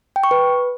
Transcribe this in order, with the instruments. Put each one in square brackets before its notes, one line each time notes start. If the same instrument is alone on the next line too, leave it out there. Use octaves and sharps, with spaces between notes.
[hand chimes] G5
C#6
B4